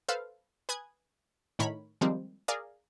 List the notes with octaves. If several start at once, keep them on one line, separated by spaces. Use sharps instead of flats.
A4 B4 C5 F5 A5
B4 G#5 D#6 F#6 G#6
A2 D#3 A3 A#4 C#5 B5
D#3 F3 G3 G#3 A#3 C4
G#4 A#4 D5 F5